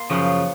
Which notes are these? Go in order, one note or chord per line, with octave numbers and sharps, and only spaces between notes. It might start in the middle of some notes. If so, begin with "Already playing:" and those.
Already playing: A#3 C6
F#2 C#3 F3